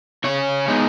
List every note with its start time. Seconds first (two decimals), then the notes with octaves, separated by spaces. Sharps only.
0.24 C#3 C#4 C#5
0.68 G#3 B3 D#4